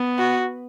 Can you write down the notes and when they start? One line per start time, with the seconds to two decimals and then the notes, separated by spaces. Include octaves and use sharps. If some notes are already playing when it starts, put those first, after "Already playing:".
Already playing: B3
0.18 F#4